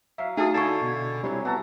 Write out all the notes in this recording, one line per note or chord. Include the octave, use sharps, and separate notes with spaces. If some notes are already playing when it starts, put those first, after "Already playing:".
F#3 E5 F5
A3 D#4 F#4 G#4 A4 F5 D#6
D3 E4 G#4 A5 C#6 C7
B2
C3 F#3 G3 E4 C#5
B3 F#4 A4 A#5